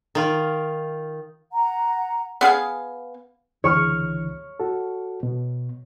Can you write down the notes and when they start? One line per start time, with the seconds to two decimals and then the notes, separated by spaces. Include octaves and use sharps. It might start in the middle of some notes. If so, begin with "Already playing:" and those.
0.15 D#3 F4
1.53 F#5 A#5
2.41 B3 G#4 F5 G#5
3.64 C#2 D3 E3 C#5 C#6 F6
4.60 F#4 A4
5.23 B2